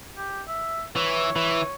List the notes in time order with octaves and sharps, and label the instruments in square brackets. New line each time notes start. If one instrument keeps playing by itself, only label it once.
[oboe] G4
E5
[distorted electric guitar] E3 [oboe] C#5
[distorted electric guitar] E3